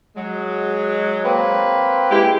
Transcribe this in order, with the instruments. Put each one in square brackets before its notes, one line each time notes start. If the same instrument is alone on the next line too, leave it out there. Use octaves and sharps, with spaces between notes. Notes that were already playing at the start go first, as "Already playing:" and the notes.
[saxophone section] F#3 G#3
[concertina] A#3 C4 B4
[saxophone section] G#3 E4 G4